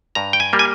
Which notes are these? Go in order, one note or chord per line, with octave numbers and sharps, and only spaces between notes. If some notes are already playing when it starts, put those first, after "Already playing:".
G2 A#5
G5
G#5
G3 A#3
G#5